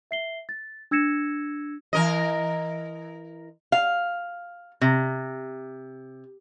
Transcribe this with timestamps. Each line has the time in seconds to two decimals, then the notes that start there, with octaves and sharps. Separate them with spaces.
0.11 E5 C7 G7
0.49 A6
0.91 D4 E6 G#6 A#6 C#7 E7
1.93 E3 A#4 D#5
3.72 F5
4.81 C3